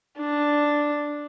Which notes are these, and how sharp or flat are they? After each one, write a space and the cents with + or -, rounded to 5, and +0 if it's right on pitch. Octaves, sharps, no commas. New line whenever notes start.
D4 +0